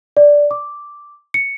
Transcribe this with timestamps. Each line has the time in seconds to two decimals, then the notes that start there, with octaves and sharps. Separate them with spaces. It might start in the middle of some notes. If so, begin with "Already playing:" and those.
0.17 D5
0.51 D6
1.34 C#7